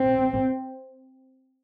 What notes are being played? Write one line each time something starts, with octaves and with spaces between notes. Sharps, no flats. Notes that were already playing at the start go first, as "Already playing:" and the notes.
Already playing: C4